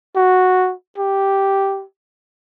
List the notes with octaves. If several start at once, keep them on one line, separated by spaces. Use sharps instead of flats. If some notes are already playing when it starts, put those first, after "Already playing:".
F#4
G4